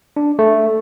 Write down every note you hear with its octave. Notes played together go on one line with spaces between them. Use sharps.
D4
A3